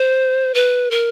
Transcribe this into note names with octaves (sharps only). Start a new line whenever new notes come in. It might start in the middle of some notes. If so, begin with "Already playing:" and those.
Already playing: C5
B4
A#4